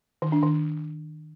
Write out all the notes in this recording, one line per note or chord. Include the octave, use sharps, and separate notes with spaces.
D#3
D4
D#3